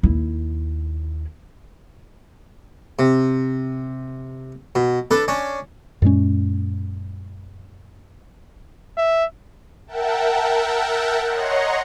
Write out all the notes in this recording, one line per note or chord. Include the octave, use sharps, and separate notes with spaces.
D#2 E4
C3
B2
D4 A4 B4
C#4 D4
F#2 A#2 G#3 C#4
E5
A#4 E5 F#5 G5 A5
C#5 D#5 F#5 A#5 C6 C#6